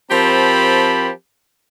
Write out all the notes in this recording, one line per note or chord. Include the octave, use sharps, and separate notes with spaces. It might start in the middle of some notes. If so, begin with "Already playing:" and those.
F3 C4 G4 A#4 A5 B5